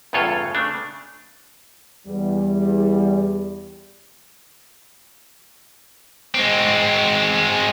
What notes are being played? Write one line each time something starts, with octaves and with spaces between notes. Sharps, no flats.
E2 G2 C#3 F4 A4 C#5
C#3 A3 D4
E2 G3
G#3 C4